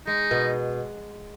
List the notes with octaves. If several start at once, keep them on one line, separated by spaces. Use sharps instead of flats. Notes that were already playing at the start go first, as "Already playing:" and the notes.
G#3 D#4
B2